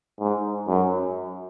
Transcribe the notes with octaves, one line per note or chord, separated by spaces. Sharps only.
G#2
F#2